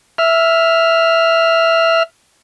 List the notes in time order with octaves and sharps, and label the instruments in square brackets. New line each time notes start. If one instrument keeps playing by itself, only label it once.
[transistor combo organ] E5 F6